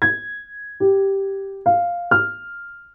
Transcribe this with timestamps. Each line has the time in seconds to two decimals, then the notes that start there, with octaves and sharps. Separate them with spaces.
0.02 G#6
0.80 G4
1.66 F5
2.11 F6